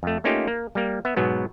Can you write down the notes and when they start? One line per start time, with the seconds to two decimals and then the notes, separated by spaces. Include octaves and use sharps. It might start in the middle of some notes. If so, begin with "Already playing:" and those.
0.03 F2 A3
0.24 A3 A#3 C#4 D#4 F4 G4
0.48 A#3
0.75 G3 A#3
1.05 B3 E5
1.17 G#2 B2 F#3 B3